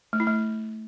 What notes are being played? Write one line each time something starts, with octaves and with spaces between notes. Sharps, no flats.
A3
E4
A3